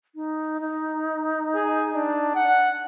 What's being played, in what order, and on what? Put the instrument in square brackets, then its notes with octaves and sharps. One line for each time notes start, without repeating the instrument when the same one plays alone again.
[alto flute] D#4
D#4
[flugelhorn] G#4
D4
F#5